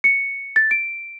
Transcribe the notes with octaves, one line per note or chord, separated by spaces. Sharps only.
C#7
A6
D7